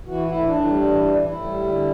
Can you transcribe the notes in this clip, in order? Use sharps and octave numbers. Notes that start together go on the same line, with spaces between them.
E3 F#4
A2 E4
A2 D4
G3
E3
A2
D4
A2 E4
G3
D3